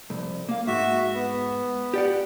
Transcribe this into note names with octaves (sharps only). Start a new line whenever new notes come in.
C2 F2
A#3 F5
G#2 F#4 E5
B3
G4 D5 F#5